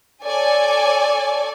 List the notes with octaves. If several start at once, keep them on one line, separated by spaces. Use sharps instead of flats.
A4 C#5 D5 G#5